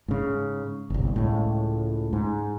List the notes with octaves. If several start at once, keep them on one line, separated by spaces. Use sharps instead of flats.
G#2 C#3
G1 C2
C#2 A2
G#2